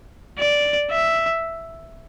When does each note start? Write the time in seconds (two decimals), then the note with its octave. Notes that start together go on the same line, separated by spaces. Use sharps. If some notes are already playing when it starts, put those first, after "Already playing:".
0.39 D5
0.91 E5